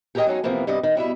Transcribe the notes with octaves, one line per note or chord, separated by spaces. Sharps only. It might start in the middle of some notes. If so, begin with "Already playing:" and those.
G4 G#4 A#4 C#5 D#5 G5
F#3 G#3 C#4 D#4 G#4
C3 E3 F3 A#3 B3
G2 C3 G3 D#5
D#3
B2 G3 E4 E5